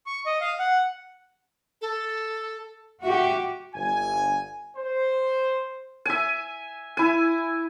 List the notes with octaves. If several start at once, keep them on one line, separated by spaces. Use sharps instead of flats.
C#6
D#5
F5
F#5
A4
F#4 G4 E5
G1 G#5
C5
E5 G#5
E4 G#5